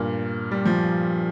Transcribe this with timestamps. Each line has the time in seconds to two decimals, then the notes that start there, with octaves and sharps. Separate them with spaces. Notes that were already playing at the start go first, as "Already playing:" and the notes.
Already playing: G2 A#2
0.51 G3
0.65 F3